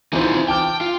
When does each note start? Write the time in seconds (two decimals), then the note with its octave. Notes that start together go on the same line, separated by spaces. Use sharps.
0.13 E3 C4 D#4 F4 C5
0.48 G5 A5 D6 F6
0.81 F4